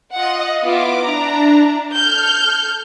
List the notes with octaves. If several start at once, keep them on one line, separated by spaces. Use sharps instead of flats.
F4 D#5 F#5
B3 E4 F4 D6
D4 E4 A#5
A4 F6 G6